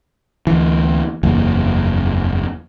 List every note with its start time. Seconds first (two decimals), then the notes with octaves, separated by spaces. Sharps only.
0.47 D2 E3
1.23 F#1 E2 A#3